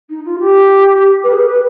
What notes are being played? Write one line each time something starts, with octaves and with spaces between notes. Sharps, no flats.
D#4
F4
G4
B4
G#4
B4